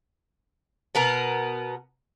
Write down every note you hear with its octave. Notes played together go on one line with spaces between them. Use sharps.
B2 B3 A#4